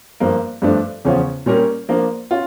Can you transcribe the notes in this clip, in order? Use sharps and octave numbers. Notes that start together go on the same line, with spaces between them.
G2 F3 A#3
G2 F3 A3 D4
E2 C#3 F3 C#4 F4
A#2 G3 C#4 G4 A#4
F3 A#3 D4
C#4 F4